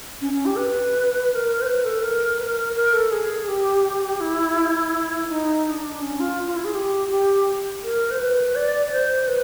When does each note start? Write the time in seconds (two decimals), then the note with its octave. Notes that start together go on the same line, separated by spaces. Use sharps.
0.21 C#4
0.33 C#4
0.46 G4
0.57 B4
1.30 B4
1.35 A#4
1.62 C5
1.67 B4
1.84 A4
2.03 A#4
2.39 B4
2.44 A#4
2.75 A#4
2.93 A4
3.12 G#4
3.48 G4
4.20 E4
5.29 D#4
5.66 D#4
5.71 D4
6.01 C#4
6.20 F4
6.47 F4
6.56 E4
6.65 G#4
6.74 G4
7.11 G4
7.83 A#4
8.10 C5
8.19 B4
8.56 D5
8.92 C5
9.28 B4